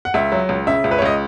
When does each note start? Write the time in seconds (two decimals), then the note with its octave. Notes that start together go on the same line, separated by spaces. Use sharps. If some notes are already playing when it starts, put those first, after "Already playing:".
0.05 F#5
0.14 C#2 E5
0.32 F#3
0.49 C#2
0.67 C#3 E5
0.84 C#2
0.91 B4
0.98 C#5
1.02 C#2 D#5